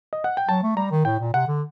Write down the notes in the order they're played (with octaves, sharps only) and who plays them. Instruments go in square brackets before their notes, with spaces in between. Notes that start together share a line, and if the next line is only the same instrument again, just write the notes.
[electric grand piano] D#5
F#5
G5
[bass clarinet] F#3 [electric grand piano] A5
[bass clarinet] A3
[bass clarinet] G3 [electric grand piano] A#5
[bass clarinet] D#3
[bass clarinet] A2 [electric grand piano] G5
[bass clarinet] A#2
[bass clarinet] C3 [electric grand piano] F#5
[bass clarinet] D3